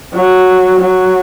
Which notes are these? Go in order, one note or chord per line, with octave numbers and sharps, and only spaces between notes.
F#3
F#3